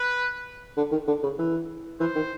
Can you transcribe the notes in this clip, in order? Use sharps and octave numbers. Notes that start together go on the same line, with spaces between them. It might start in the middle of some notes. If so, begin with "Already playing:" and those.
Already playing: B4
D3
D#3
D3
C#3
E3
E3 C5
D#3